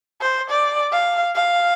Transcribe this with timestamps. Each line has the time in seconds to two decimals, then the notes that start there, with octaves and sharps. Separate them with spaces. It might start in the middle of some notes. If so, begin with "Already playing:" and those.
0.21 C5
0.50 D5
0.92 F5
1.35 F5